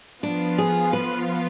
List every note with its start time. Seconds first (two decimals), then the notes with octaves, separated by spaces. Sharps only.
0.23 F3 B3 D4 F4
0.58 G#4
0.93 B4